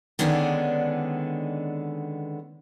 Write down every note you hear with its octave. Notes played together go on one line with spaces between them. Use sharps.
D3 D#3 G#3 B3 C#4 D4